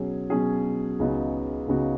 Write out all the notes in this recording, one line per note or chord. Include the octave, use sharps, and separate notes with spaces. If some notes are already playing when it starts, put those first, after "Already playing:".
Already playing: B2 F#3 C#4 G#4
B2 F#3 C#4 G#4
C#2 C#3 B3 D#4 F#4
C#2 C#3 B3 D#4 F#4